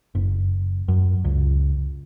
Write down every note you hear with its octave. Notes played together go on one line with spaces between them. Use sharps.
F#1
F#2
C#2